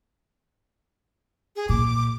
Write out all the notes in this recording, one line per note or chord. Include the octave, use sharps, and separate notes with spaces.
G#4
A#2 D6